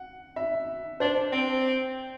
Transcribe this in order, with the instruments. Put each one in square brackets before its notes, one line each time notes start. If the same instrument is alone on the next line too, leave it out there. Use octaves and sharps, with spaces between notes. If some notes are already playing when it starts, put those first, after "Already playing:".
Already playing: [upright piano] F#5
E5
[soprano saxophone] D4 [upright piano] C5
[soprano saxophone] C4